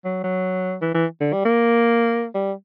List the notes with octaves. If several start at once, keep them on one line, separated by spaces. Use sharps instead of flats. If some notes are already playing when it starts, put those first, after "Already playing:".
F#3
F#3
E3
E3
D3
G3
A#3
G3